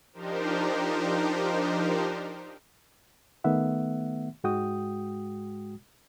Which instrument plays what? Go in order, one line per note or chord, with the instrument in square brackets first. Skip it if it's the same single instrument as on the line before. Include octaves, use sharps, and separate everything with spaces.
[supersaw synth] F3 D4 D#4 G4 A#4 C5
[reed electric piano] D#3 A3 B3 E5 F#5
G#2 G#3 F#4 G5 D#6